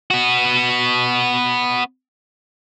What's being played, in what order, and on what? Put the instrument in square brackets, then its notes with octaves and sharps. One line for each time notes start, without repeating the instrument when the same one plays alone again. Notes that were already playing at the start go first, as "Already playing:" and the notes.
[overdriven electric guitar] B3 F#4